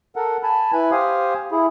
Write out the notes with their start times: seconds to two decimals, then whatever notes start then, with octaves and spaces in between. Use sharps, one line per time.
0.16 A4 A#4 F#5
0.43 G#5 A5 B5
0.73 E4 B4 G#5 B5
0.91 G4 C5 F5 G#5 D#6
1.51 E4 G#4